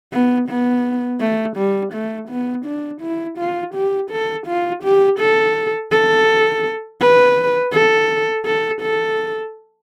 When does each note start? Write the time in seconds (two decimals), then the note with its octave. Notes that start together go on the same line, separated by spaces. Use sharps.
0.13 B3
0.49 B3
1.21 A3
1.57 G3
1.93 A3
2.29 B3
2.66 D4
3.02 E4
3.39 F4
3.75 G4
4.11 A4
4.47 F4
4.84 G4
5.20 A4
5.92 A4
7.01 B4
7.73 A4
8.46 A4
8.82 A4